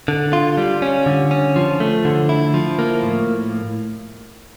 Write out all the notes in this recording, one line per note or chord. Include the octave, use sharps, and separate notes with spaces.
D3
F4
G3
C#4
D3
C#4
F3
A3
D3
E4
F3
A#3
A2